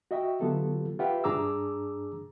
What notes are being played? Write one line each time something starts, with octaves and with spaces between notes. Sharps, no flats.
F#4 D#5 E5 G5
D3 F#3 B3 F4 G4 A4
F4 G4 B4 E5 F#5 G5
G2 D4 G#4 A#5 D6 E6